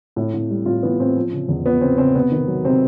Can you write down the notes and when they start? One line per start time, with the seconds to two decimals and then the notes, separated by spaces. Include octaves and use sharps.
0.16 A2 E4
0.34 A2
0.50 G3
0.66 A2 F4
0.83 E3 B3
1.00 A2 C4
1.16 F3
1.33 C#3
1.49 E2
1.66 F3 B3
1.81 C#3 C4
1.98 C#3 C4
2.15 C3 B3
2.32 D#3
2.48 F#3
2.64 C3 C4